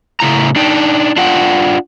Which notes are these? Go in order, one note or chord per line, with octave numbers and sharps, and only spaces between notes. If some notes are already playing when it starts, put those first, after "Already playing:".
A2 C#3 E4 A#5
D4 D#4 G5
D4 F4 F#5 G5